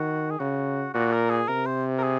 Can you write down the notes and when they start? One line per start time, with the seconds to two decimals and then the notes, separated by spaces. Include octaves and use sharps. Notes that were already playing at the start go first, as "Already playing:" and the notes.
Already playing: D#3 F#4
0.31 G#4
0.40 C#3 F#4
0.94 A#2 F#4
1.13 A#4
1.30 G#4
1.48 C3 A#4
1.66 C5
1.98 A#4
2.03 G#4